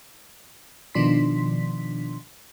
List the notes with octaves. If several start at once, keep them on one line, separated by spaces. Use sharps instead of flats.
B2 D#3 F3 D4 C6 B6